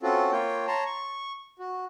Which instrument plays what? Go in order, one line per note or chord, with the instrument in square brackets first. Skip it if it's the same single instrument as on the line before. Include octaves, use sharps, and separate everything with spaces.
[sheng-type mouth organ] C4 C#4 F4 F#4 A4
A#3 F4 C#5 G5
C#5 A5 A#5 C6
C#6
F#4